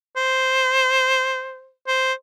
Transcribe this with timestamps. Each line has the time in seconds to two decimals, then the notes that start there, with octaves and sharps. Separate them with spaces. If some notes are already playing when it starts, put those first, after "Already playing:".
0.16 C5
1.87 C5